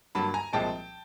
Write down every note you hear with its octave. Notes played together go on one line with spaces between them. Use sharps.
G2 D3 F#3 A#3 A5 B5
G#5 A#5
C2 A#2 F3 G#3 G5 A5